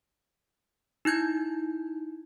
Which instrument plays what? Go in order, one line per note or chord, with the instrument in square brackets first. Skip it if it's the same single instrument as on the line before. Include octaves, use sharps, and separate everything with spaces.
[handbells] D#4 E4 G6 G#6